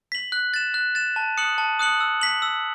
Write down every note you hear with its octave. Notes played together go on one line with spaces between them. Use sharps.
B6 F#7
F#6
A6 E7
F#6
A6 E7
A5
D#6 F#6 C#7 F#7
A5
D#6 F#6 C#7 F#7
E6
B6 F#7
E6